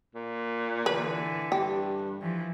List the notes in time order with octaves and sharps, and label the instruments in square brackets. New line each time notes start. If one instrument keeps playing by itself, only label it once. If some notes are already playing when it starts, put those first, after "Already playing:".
[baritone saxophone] A#2
[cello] D3 E3 [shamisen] B4
[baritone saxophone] G2 [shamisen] G4
[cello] E3 F3